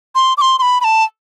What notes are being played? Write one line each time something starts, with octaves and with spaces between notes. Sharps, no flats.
C6
D6
C6
C6
B5
B5
A5